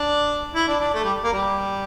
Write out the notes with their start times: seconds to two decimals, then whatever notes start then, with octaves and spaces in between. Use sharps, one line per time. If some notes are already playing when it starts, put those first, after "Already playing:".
Already playing: D4
0.55 E4
0.68 D4
0.80 D4
0.94 A3
1.04 G3
1.24 A#3
1.33 G3